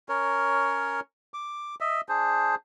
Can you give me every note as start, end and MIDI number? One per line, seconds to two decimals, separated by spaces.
0.09 1.00 61
0.09 1.00 70
0.09 1.00 73
1.34 1.75 86
1.81 2.01 75
1.81 2.01 76
2.09 2.55 62
2.09 2.55 68
2.09 2.55 72